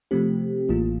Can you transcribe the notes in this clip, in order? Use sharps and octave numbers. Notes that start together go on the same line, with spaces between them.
C3 F3 A3 C4 G4
A1 A2 E3 A#3 F4